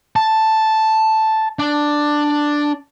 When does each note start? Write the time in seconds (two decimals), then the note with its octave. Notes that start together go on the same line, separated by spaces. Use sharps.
0.16 A5
1.59 D4